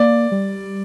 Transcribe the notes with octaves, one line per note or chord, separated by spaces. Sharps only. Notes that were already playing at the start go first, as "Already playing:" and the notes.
Already playing: A#3 D5
G3